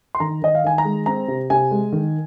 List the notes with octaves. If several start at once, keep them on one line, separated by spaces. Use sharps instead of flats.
C6
D#3 A#5
D#3 D#5
F5
D#3 G#5
A#5
G#3
C4 A#5
C3
C3 G#5
G#3
D#3